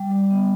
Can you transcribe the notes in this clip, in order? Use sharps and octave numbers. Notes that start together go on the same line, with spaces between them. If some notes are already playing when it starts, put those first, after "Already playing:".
Already playing: G3 G5
G3
B3